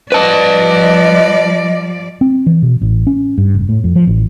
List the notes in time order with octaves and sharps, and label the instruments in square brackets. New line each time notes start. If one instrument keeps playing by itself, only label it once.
[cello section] F3 G3 D5 [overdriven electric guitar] B4 A5 [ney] D#5
[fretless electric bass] C4
E3
B2
A1
C#4
G2
F1
A2
F2
F3
A1